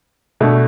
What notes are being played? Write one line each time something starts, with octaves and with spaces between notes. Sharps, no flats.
B2 A3 D4